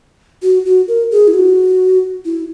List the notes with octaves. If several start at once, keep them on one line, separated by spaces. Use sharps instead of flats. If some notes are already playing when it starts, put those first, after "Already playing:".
F#4
F#4
A#4
G#4
E4
F#4
E4